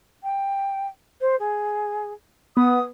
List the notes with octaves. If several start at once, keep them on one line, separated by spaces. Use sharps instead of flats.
G5
C5
G#4
B3 D#6